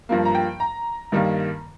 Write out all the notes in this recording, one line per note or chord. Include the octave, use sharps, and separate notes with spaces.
G2 F3 A#3
A#5
G5
A#5
G2 D#3 G3 A#3